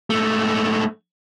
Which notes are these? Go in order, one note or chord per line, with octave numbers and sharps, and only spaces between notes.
G#2 A3